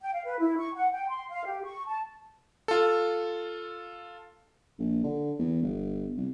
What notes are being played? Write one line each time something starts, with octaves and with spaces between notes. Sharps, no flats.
G5
F5
B4
E4
C#6
F#5
G5
C6
F5
G4
C#6
A5
F4 A4
A#1
D3
E2
G1
C2